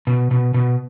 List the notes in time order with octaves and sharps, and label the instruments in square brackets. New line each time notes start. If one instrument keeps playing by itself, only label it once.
[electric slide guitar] B2
B2
B2